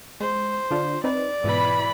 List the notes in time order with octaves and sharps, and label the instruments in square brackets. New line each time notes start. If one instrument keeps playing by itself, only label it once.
[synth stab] G#3 [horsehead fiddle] C5
[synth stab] D3 D4 F4
[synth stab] C4 D#4 B4 [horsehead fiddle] D5
[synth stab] G#2 B2 [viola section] E3 B5